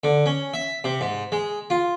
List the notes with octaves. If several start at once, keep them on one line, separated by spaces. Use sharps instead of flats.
D3
C#4
E5
C3
G#2
G#3
F4